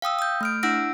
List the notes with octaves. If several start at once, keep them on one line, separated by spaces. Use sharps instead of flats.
F5 G5 D#6 E6
D#6 G6
A3 F6 D7
D4 E4 F#5 E6 A#6 D7